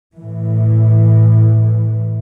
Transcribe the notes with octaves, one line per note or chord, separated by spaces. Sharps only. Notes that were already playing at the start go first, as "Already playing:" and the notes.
A2 E3